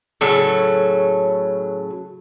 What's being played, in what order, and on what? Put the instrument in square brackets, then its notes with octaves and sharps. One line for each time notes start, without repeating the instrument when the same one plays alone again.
[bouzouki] A2 C#3 F#3 A4